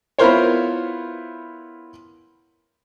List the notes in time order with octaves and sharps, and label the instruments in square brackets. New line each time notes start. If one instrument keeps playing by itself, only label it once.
[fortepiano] B3 E4 F4 A#4 C5 C#5